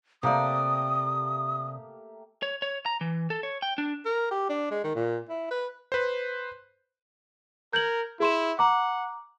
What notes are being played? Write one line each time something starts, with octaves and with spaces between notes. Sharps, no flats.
C3 A3 A#3 G4 D5 D#6
C#5
C#5
A#5
E3
A4
C#5
G5
D4
A#4
G4
D4
G#3
D#3
A#2
E4
B4
B4 C5
A#4 G6 G#6 F#7
E4 G#4 C6 E7
F#5 A#5 D6